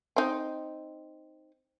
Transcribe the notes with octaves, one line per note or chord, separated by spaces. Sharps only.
C4 D#4